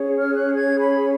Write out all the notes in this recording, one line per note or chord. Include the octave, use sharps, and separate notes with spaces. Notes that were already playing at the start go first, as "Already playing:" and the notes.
Already playing: C#4 G#4 C#5
F6
F#6
G#6
B5